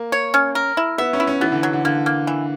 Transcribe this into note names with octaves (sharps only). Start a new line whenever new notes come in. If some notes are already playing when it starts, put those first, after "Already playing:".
Already playing: A#3
C#5
C#4
A#4
E4
B3 E5
C#4
E4
C#4
E3 B3
D3
F#3
D3
D3 A#3
A#3
E3